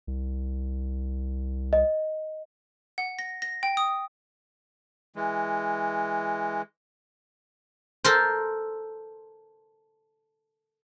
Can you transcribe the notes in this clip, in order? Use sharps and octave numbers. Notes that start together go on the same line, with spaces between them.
C2
D#5
F#5
A#6
A#6
G5
D#6
E3 G#3
A4 A#4 C5